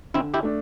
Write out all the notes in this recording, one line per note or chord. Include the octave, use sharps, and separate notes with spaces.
D3 C4 E4
E4 G4
A3 D4